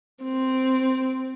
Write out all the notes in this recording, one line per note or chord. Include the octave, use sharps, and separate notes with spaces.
C4